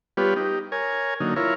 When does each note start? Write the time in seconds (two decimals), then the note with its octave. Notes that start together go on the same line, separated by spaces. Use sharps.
0.17 G3 B3 F4 G4 B4 C#5
0.36 D#4 G4
0.72 A#4 C#5 G#5
1.20 D3 F#3 A#3 D#4
1.36 E4 F4 A#4 C#5